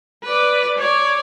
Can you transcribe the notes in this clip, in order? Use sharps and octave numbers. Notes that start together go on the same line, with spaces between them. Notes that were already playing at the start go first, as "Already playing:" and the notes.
B4 D5
C#5 D5